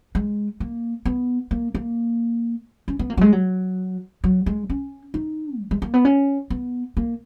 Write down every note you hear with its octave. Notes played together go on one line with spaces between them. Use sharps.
G#3
A#3
B3
A#3
A#3
C#4
B3
A#3
F#3
G#3
F#3
F#3
G#3
C#4
D#4
F#3
G#3
A#3
B3
C#4
B3
A#3